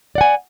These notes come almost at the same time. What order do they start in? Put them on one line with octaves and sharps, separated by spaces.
D5 F#5 G#5